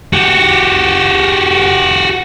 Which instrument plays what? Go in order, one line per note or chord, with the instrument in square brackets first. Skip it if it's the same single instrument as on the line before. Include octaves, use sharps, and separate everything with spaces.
[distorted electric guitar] F#4 G4